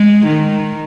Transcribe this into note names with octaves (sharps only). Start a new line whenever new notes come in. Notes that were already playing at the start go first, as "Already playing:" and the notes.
Already playing: G#3
D#3